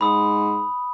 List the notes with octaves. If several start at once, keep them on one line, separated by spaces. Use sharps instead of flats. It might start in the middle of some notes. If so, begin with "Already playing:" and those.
G#2 B5 D#6